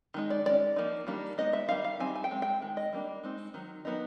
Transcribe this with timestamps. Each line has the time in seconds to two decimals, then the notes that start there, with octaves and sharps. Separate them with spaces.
0.14 D#3 G#3 D#4
0.30 D5
0.46 G#3 C#4 D5
0.76 F3 A#3 D#4
1.07 D#3 G3 A#3 D4
1.38 G#3 B3 D#4 D#5
1.53 E5
1.68 D#3 G3 C4 D#4 F5
1.84 F5
1.99 G3 C4 D#4 G#5
2.16 G#5
2.24 G5
2.31 G#3 C4
2.42 G5
2.62 D#3 G#3
2.77 D#5
2.93 G3 A#3 D4
3.24 G#3 C4 D#4
3.54 D#3 F#3
3.85 D#3 F#3 B3 D#4